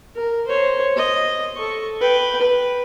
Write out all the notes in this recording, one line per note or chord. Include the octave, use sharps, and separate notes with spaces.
A#4
C5 C#5
D#5
A4 C#6
B4 G5
B4